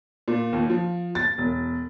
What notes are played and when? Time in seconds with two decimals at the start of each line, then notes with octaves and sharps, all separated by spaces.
0.28 A#2
0.53 D#2
0.70 F3
1.15 A6
1.38 E1